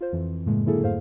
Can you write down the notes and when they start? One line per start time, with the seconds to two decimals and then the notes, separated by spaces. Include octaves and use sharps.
0.01 F4 C5
0.12 F2 E3
0.46 F#2 A2 C#3 G#3 A#3
0.66 D3 F#3 A#3 E4 G#4 A4
0.81 F2 G#2 A3 C5 F5